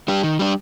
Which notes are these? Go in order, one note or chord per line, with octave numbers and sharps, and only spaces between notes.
G3 D4 G4
D#3
G3 D4 G4